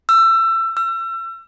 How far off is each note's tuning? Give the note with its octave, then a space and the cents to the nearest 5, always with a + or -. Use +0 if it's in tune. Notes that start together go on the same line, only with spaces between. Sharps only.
E6 +25
E6 +35